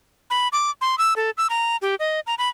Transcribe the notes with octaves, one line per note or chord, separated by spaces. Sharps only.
B5
D6
C6
E6
A4
E6
A#5
G4
D#5
A#5
B5